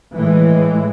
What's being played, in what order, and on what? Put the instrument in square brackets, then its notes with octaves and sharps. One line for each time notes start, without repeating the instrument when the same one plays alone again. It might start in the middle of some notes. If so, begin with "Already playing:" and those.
[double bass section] A2 E3 G#3